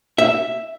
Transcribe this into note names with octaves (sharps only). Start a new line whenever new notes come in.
E5